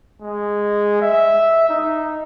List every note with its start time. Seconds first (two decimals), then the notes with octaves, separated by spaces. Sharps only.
0.22 G#3
1.02 E5
1.69 D#4